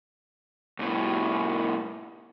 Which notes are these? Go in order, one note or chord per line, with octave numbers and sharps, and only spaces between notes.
C2 A2